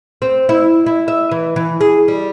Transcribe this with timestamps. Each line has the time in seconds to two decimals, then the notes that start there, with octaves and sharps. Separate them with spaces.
0.22 C4
0.49 E4
0.86 E4
1.08 E5
1.31 E3
1.56 E3
1.81 G#4
2.08 G3